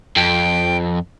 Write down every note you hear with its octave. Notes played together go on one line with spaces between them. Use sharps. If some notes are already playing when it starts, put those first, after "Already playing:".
F2 G5